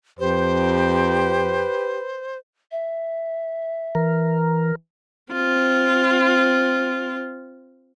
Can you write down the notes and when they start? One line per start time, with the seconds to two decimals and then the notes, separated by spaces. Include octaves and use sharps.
0.19 F2 G4 B4 C5
2.71 E5
3.95 E3 A#4
5.32 C4 F4